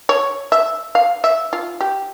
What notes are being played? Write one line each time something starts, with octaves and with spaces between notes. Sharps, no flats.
C#5
E5
F5
E5
F4
G4